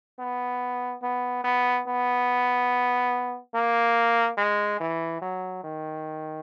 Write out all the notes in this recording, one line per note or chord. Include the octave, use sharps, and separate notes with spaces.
B3
B3
B3
B3
A#3
G#3
E3
F#3
D#3